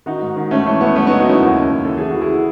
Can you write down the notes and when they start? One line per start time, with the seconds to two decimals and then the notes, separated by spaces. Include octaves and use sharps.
0.06 D#3 D#4 F#4
0.22 G#2
0.36 D#3
0.51 C#2 A3 C#4
0.66 E3 A3
0.81 C#2 B3
0.96 F#2 A3 C#4
1.07 B3 D#4
1.11 C#3
1.19 D#4 F#4
1.25 F#2 C#4 E4
1.41 D#2
1.55 C#3
1.70 D#2
1.85 E3 A4
1.97 E3 G#4
2.10 E3 F#4
2.21 E4 G#4